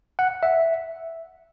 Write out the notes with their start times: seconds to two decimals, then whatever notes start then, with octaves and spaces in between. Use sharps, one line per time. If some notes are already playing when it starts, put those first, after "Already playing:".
0.19 F#5
0.43 E5